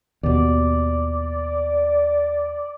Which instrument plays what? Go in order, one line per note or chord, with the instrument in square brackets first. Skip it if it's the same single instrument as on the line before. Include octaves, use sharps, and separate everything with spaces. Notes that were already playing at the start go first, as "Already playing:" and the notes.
[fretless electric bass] D#2 B2 [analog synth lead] D5